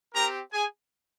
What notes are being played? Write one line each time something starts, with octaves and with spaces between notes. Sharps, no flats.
C4 G4 A#4 A#5
G#4 G#5